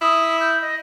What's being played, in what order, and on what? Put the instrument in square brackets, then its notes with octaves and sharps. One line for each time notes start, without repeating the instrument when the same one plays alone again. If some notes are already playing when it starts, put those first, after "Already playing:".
[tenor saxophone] E4 [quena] D#6
[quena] G6
D#5